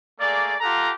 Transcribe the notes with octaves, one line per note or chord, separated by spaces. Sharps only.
A3 A#3 G#4 D5
F4 G4 A4 F#5 A#5